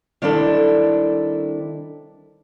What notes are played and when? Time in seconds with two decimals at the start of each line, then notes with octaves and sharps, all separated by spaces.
0.22 D#3 G3 C4 D4 E4 A4